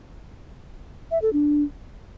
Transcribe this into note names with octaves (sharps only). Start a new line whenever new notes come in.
E5
A4
D4